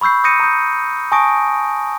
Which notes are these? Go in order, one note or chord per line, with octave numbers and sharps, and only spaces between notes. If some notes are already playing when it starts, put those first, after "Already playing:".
B5 C#6 E6 G6 C7
D#6 G6 A#6 C#7 D#7
A#5 D#6 G6
G#5 A5 C#6 D#6 A#6 D7